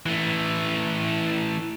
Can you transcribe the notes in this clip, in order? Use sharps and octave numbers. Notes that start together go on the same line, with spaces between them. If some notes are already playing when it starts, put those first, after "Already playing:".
E3 A3